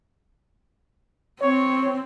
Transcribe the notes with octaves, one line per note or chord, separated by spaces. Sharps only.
C4 C#5